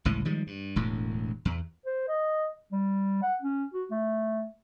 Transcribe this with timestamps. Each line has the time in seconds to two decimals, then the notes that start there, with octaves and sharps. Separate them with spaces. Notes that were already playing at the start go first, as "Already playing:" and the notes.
0.05 G1 C#2 A2 E3
0.25 D#3 F3 G3 G#3
0.47 G2
0.76 E1 D2 A2
1.45 E2
1.86 C5
2.08 D#5
2.72 G3
3.22 F#5
3.42 C#4
3.73 F#4
3.91 A3